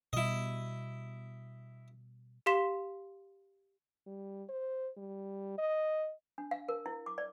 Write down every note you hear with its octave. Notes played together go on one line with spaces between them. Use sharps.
B2 G3 E4 D#5
G4 F5 C6 B6 E7
G3
C5
G3
D#5
D4
F5
A#4
E4
D6
D5